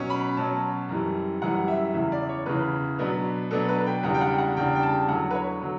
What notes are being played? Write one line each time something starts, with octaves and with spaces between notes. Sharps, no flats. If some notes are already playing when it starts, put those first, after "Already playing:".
Already playing: B2 F#3 C#4
B5
B2 F#3 C#4 A5
F#2 E3 G3
F#2 E3 G3 F#5
E5
E2 C#3 E3 E5
D5
C#5
E2 C#3 E3 B4
B2 F#3 B3 D4
B2 F#3 B3 D4 A4
B4
G5
E2 C#3 G3 D4 F#5
G5
F#5
F#5
E2 C#3 G3 D4 G5
G5
A5
E2 D3 F#3 F#5
B4
C#5
D3 F#3